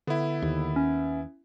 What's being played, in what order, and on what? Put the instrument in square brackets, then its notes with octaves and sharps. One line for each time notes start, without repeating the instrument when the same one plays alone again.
[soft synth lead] D3 [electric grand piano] B3 E4
[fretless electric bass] D#2
[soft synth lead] C#4